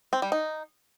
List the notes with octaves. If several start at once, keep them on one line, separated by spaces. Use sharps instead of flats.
C4
G3
D#4